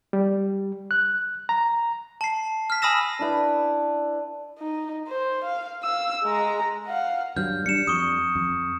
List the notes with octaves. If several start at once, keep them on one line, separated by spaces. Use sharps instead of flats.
G3
F#6
A#5
A5 C7
F6 B6
G#5 B5 D#6 E6 A#6 E7
D4 E4 B4
D#4
C5
F5
F5 E6
G#3 A#5
F5 F#5
G2 F#3 F6 G6
G3 C#4 D4 C#7 E7
F2 C#6 D#6
F2